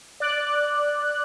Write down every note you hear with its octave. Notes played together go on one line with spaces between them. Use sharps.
D5 F#6